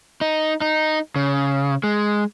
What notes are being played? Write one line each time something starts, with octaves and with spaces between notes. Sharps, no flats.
D#4
D#4
C#3
G#3